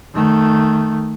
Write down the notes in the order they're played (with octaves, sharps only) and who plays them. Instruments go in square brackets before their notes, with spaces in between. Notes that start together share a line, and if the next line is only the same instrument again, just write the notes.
[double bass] D#3 A3